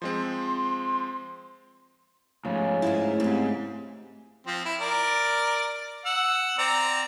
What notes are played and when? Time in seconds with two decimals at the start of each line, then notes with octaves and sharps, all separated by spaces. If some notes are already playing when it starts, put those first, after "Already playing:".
0.02 F3 G#3 C4 C6
2.45 G#2 C#3 F3 A3
2.82 G#2 E4 F4 C5
3.20 G#2 C4 G4
4.47 F3 C4
4.65 E4
4.80 A#4 D5
6.05 F#5 E6
6.58 C4 D5 A#5